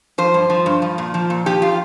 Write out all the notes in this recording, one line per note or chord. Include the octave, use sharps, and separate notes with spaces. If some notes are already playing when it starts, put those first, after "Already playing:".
F3 C5
G2
F3
G2
F3
A#2
F3
A#2
F3 G4
F4